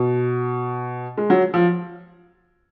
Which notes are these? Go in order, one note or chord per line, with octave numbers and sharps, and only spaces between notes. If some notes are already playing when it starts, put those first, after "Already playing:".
Already playing: B2
G#3
F#3
F3